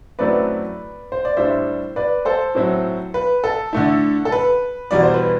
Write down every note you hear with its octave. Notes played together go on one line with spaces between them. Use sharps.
F#2 F#3 A3 C4 E4 B4 D5
C5
D5
A2 G3 D4 C5 E5
B4 D5
A4 C5
A2 F#3 C4 E4
B4
A4
D3 A3 E4
A4
B4
E2 B2 G3 D5
C5
B4